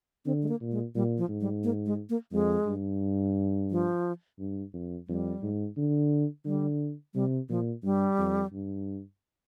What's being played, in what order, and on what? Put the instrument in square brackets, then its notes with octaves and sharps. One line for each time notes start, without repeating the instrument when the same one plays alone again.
[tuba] D3 [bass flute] C4
[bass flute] G#3
A#3
[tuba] A#2
[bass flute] G#3
[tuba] A#2 [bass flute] G3
[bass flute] F3
[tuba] G#2
[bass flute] G3
A#3
G#3
A#3
[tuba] F2 [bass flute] G#3
[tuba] G2
[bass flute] F3
[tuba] G2
F2
[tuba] F2 [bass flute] G3
[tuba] G#2
D3
[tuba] D3 [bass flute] G3
[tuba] C3 [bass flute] G3
[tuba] A#2 [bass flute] F3
[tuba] G2 [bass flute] G3
[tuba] F2
G2